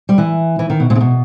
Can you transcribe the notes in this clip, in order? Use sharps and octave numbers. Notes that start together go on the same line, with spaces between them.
G3
E3
E3
D#3
B2
A#2
C#3
B2